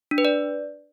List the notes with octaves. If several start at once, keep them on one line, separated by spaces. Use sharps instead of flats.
D4
B4
D5